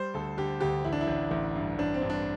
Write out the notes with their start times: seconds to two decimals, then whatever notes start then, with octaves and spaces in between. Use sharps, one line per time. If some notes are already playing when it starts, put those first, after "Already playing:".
Already playing: G3 C5
0.14 D2 A4
0.37 D3 G4
0.60 D2 G4
0.84 A1 E4
0.93 D4
1.01 E4
1.07 A1
1.31 A1
1.55 G2
1.78 A1 D4
1.94 C4
2.01 G2
2.10 D4